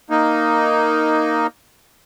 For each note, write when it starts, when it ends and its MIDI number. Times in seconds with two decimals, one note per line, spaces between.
0.10 1.47 58
0.10 1.47 63